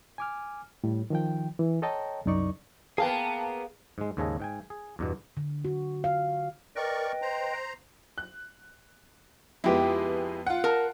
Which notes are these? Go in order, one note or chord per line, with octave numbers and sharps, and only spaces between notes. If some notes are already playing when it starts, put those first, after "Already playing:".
G#5 D6 F6
A2 G3
D#3 F3 G5
E3
A4 C#5 D#5 G5 A5 A#5
C2 F#2 F#3 D#4 D5 C#6
A#3 B3 G#4 F5 G5 A5
G#2 G#3
D#2 G#2 C#3 G#4 A4 D#5
G#2 G5 G#5
G#4
E2 G2 B2
D3
F#4
F5
A#4 B4 D5 D#5 G5 C#6
C5 A#5
F#6
F2 G#3 B3 E4 G4
F4 F#5
A#4 A5